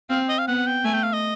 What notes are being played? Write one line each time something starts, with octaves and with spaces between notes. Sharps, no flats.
C4 F5
D#5
F5
B3 F#5
G5
A3 G#5
G5
F5
D#5